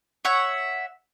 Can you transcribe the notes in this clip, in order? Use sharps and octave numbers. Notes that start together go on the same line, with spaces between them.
C#5 E5 F#5